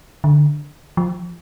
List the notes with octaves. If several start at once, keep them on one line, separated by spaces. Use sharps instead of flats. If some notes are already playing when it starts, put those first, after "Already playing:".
D3
F3